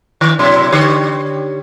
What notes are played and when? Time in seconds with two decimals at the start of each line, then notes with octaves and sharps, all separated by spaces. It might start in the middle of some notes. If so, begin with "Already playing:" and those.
0.21 D#3
0.39 B2 F#3 E4
0.72 D3 G4 C#5